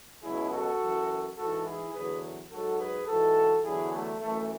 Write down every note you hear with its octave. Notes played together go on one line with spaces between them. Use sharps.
C#2 B2 F#3 E4 G#4
F#4 A4
F#2 E3
G#2 E3 F#4 A4
E4 G#4
E2 D3 F#3 G#4 B4
G#2 F#3 F#4 A4
G#4 B4
G#2 E3 F#4 A4
E2 D3 F#3 E4 G#4
A3
F#2 E3 A3